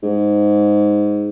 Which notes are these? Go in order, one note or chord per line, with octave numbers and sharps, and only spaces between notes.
G#2